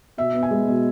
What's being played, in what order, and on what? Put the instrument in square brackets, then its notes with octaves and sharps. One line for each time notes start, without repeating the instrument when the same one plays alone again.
[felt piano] B2 E5
B3
G#5
G#3
B2